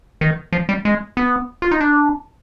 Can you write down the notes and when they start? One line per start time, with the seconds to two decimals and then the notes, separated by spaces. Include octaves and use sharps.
0.21 D#3
0.53 F3
0.69 G3
0.85 G#3
1.17 B3
1.62 F4
1.71 D#4
1.81 D4